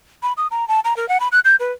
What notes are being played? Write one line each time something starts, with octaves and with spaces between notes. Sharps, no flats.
B5
D#6
A#5
A5
A#5
A#4
F#5
B5
F#6
G6
B4